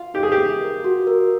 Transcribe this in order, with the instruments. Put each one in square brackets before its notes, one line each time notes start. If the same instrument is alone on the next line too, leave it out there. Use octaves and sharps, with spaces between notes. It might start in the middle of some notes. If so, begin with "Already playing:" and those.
Already playing: [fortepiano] F4
[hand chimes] D#4 [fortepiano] G4
[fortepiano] G#4
G4
[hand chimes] A#3
A#4
F#4
A#4